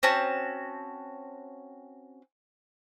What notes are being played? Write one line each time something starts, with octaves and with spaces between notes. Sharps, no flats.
C4 C#4 F#4 A5